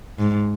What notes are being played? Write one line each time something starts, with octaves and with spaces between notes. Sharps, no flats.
G#2